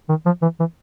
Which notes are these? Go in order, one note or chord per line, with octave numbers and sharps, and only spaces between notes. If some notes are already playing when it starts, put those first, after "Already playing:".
D#3
F3
E3
E3